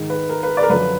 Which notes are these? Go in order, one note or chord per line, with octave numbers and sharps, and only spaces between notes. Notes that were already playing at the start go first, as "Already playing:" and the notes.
Already playing: G#2 D#3
B4
A#4
B4
D5
A#4
F#2 D3 F3 B4